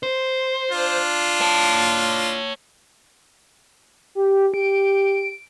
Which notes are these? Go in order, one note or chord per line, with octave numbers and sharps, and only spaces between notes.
C5
D4 F4
C#5 A5
G4
G4 D7